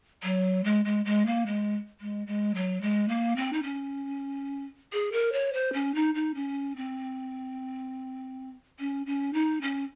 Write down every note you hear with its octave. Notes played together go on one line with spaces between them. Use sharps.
F#3
G#3
G#3
G#3
A#3
G#3
G#3
G#3
F#3
G#3
A#3
C4
D#4
C#4
G#4
A#4
C#5
C5
C#4
D#4
D#4
C#4
C4
C#4
C#4
D#4
C#4